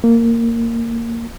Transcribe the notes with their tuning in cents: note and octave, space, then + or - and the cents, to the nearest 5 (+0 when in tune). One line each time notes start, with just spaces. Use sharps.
A#3 -15